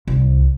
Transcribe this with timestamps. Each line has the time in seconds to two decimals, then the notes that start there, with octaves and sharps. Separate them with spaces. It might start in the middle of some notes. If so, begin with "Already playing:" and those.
0.07 C2